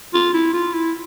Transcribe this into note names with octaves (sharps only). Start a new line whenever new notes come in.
F4
E4
F4
E4